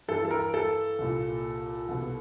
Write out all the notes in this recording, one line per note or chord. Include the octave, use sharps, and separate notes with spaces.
G2 E3 A4
A4
A#4
A4
C2 A#2
C2 B2